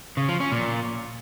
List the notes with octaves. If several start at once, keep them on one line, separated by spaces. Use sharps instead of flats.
C#3
F3
C#4
A#2